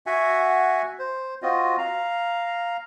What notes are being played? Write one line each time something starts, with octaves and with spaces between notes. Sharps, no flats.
F#4 E5 F#5 G#5
C5
C4 F4 F#4 D#5
F5 A#5